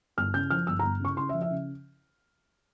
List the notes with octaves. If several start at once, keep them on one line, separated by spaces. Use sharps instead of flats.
G1 F6
C#3 G6
F3 F6
G1 E6
G1 A#5
C#3 C#6
C#3 C6
E5
F3
E5
C#3